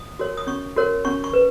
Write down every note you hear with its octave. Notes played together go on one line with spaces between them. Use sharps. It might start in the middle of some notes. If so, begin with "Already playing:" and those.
Already playing: D#6
F#4 A#4 C#5
D#6
C#4 C#6
F#4 A#4 C#5
C#4 C#6
C#6
B4